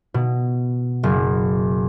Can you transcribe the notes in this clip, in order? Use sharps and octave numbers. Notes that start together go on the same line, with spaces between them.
B2
F#1